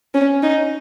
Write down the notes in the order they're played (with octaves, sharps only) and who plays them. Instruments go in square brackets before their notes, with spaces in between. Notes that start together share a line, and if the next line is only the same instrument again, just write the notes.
[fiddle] C#4
D#4